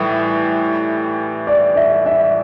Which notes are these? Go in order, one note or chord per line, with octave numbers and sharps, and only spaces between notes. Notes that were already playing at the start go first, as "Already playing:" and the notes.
Already playing: A2 E3 G3 E5
D5
E5
E5